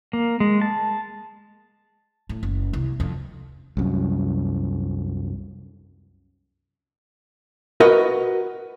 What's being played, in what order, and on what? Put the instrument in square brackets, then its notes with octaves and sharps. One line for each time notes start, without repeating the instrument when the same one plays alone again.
[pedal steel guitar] A#3
G#3
A5
[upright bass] A2
F#1
C2
F2
[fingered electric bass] C2 F#2
[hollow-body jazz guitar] F#4 A#4 B4 D#5